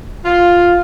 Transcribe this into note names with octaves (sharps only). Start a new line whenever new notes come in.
F4